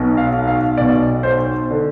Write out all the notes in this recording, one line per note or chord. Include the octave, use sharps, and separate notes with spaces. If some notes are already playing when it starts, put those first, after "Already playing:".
Already playing: B1 B2
F5
F5
B1 B2 D5
C5
D3